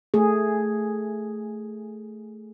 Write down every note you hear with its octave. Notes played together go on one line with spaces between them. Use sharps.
A3 G#4